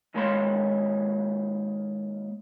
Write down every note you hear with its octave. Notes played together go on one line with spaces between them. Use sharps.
D#2 G#3 A#3 C#5 G#5 C6